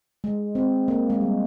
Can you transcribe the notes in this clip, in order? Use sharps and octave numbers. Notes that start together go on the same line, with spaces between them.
G#3
C4
A#3
G#3
G3